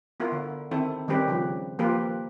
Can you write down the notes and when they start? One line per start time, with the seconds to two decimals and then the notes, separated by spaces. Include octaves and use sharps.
0.20 B3 E4 F4 A#4
0.32 D3
0.71 D#3 C4 E4 A4
1.08 D#3 G3 C4 C#4 G4 B4
1.28 C#3 F3
1.79 F3 A#3 F4 G4 A#4 B4